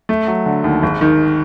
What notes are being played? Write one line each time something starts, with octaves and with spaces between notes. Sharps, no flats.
A3
F#3
D3
D#2
G#1
D#3